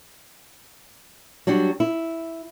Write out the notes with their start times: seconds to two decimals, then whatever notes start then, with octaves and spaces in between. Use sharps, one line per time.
1.47 F#3 G3 D4 F#4
1.80 E4